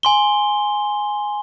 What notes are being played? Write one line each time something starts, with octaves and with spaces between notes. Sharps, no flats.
G#5 C6 G7